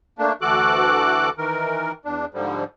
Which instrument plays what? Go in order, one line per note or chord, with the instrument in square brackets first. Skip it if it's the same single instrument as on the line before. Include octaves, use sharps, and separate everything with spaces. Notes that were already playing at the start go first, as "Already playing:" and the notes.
[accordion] A3 A#3 D4
D2 E3 F#4 A4 D6 F#6
D#3 E3 A#4
E2 D4
G#2 D3 F3 G3